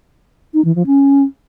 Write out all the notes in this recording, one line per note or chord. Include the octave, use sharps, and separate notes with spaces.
D#4
E3
F3
C#4